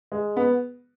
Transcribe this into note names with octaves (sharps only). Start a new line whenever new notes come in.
G#3
B3